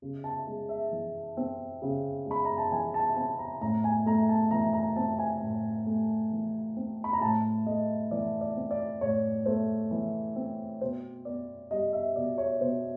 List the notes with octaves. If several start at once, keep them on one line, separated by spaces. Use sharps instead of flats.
C#3
A5
G#3
E5
E3
C4
C#3
G#3 B5
A#5
A5
E3 G#5
A5
C4 A5
A#5
A2 A#5
G#5
A3 A#5
A5
E3 A#5
A#5
C4 A5
G#5
A2
A3
E3
C4
B5
A#5
A2 A5
A3 D#5
E3 D5
D5
C4
D5
A2 C#5
A3 C5
E3
C4
B2 C5
B3 D5
G3 D#5
E5
B2 D5
C#5
B2 C5